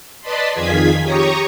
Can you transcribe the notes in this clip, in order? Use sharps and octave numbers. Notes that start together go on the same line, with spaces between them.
B4 D5 D#5 A5 B5 C6
F2 D#3 F4 G#4 G#6 B6
G4 C#5 A#5 C#6 D#6